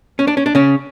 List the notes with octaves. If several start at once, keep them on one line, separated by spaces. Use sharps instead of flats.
C#4
D4
C#4
D4
C#3 C#4